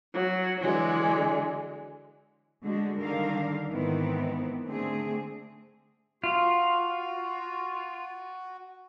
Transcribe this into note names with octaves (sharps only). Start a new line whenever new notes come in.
F#3
D3 E3 F#3 G#3
D3 G#3 F#4
D3 D#3 G3 A#4 F5
G#2 D#3 E3 B3 C4
D3 A3 C4 G#4
F4 F#4